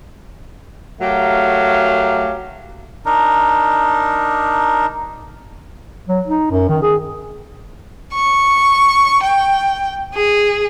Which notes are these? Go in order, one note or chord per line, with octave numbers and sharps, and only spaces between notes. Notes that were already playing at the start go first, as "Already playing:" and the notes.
F#3 A3 G4 A#4 F5
D4 D#4 A#4
F#3
D#4
F#2
D#3
G#4
C#6
G5
G#4